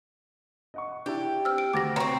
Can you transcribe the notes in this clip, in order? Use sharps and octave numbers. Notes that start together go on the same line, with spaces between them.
D#5 F#5 C#6
D4 E4 G4
C4 E6 F6
D7
D2 F#4 D6 A6 A#6
B3 C4 C#5 A#5 C6 C#6